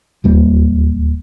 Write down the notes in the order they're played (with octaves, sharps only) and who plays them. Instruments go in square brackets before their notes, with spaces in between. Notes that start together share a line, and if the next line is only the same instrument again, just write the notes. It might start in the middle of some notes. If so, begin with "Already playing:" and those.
[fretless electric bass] D1 D#2 G3 A#3